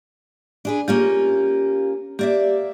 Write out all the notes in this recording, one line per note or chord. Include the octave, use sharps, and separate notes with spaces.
D4 G#4 B4
A#3 C#4 F4 G4
A#3 G4 D5 E5